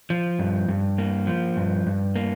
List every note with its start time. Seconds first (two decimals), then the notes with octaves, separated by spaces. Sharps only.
0.10 F3
0.39 G2
0.68 G2
0.98 A#3
1.27 F3
1.57 G2
1.87 G2
2.16 A#3